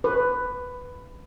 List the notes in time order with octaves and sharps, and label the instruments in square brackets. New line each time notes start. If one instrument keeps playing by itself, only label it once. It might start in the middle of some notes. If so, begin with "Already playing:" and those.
[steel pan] B4